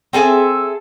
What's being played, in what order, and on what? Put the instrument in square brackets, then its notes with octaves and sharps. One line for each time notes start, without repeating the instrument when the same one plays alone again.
[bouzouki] C4 G#4 A4 E5